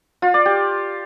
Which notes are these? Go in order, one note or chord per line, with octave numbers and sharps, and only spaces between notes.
F4
D5
G4